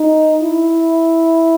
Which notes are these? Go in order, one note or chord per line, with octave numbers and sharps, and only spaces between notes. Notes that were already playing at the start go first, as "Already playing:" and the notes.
Already playing: D#4
E4